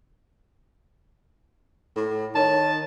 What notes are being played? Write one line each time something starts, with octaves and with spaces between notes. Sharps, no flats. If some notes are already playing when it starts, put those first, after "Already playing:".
A2
D#3 C#5 A5